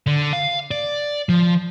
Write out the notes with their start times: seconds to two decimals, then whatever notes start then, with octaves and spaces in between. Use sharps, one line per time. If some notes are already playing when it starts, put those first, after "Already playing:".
0.07 D3
0.33 F5
0.71 D5
1.29 F3